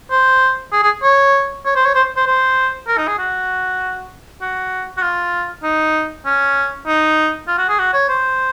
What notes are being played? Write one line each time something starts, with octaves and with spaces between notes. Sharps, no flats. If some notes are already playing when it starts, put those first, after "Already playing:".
C5
G#4
G#4
C#5
C#5
C5
C#5
C5
C5
C5
A#4
D#4
G#4
F#4
F#4
F#4
F4
D#4
C#4
D#4
F4
F#4
G#4
F#4
C#5
C5